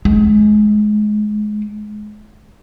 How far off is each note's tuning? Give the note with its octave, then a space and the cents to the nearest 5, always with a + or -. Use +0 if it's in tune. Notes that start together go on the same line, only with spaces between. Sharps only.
G#3 +25